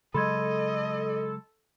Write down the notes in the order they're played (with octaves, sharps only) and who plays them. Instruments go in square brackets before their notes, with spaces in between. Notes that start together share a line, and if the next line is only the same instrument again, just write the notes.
[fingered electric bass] C#3 F#3 G#3 [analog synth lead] A4 [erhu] D#5 [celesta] B5 C6 G#6